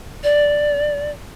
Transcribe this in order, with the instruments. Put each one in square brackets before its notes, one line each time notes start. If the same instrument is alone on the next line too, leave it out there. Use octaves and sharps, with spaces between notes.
[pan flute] D5